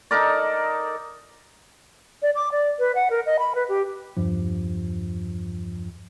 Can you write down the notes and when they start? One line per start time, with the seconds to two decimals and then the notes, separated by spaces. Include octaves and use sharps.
0.11 D#4 A4 A#4 D5
2.22 D5
2.35 D6
2.52 D5
2.79 B4
2.95 F#5
3.10 A#4
3.26 D#5
3.39 B5
3.55 B4
3.69 G4
4.17 E2 G2 F3